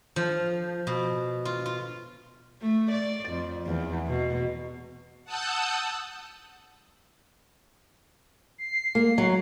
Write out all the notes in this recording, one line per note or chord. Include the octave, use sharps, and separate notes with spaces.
F3
B2
F4
F4
A3
D5
F2
E2
B2
F#5 A5 D#6 E6 F#6 G6
C7
A#3
F#3